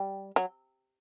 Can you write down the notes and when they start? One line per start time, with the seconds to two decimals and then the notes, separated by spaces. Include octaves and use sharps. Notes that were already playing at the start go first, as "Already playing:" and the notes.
Already playing: G3
0.36 F#3